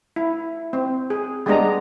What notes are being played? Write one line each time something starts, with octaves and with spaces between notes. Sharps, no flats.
E4
C4
G#4
G3 G#3 B3 D4 D#5 A#5